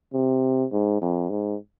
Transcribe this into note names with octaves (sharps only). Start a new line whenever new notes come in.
C3
G#2
F2
G#2